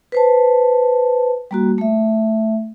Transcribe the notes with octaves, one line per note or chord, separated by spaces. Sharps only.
B4 C5 A5
G3 A#3 F#4
A3 E5